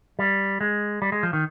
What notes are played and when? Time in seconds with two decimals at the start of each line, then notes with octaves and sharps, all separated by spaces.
0.19 G3
0.61 G#3
1.02 G3
1.12 G#3
1.23 F3
1.33 D#3